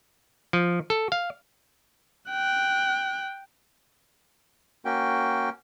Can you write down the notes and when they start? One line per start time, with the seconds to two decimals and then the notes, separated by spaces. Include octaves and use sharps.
0.53 F3
0.90 A4
1.12 F5
2.30 G5 F#6
4.85 A#3 C#4 F#4 G5